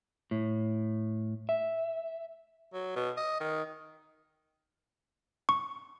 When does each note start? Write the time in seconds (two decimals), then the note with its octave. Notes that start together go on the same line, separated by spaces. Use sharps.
0.31 A2
1.49 E5
2.73 F#3
2.96 B2
3.17 D#5
3.40 D#3
5.49 C#6